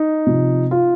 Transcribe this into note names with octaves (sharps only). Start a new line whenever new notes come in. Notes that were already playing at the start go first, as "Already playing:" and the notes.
Already playing: D#4
C3 F3
F4